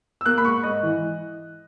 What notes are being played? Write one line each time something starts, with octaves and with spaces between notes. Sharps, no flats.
E6
A#3 F#6
B5
G#2 C#6
G#2 D#5
E3